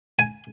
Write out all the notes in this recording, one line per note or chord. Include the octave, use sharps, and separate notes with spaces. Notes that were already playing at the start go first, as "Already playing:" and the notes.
G#5